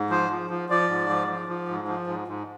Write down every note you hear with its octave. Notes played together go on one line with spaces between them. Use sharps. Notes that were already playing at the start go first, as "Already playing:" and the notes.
Already playing: G#2
F3 C5
F3
F3
F3 D5
G#2
F3
F3
F3
G#2
F3
G#2
G#2